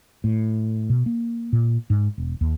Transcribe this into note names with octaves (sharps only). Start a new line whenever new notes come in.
A2
B2
A#3
A#2
G#2
E1
D#2